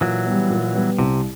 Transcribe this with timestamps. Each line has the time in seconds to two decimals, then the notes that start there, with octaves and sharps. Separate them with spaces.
0.01 A#2 E3 F#3
0.26 G3 B3
0.50 A#2
0.75 G3 B3
0.99 C2 C3